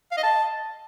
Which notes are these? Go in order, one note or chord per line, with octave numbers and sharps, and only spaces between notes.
F5
D#5
A5